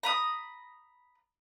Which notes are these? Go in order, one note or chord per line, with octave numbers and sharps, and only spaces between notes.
A#5 B5 D#6